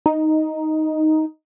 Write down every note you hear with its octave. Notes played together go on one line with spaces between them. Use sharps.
D#4